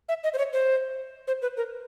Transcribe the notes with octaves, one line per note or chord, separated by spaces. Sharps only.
E5
D#5
C5
C#5
C5
C5
B4
A#4